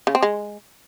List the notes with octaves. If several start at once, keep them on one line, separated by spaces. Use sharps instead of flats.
C#3
C4
G#3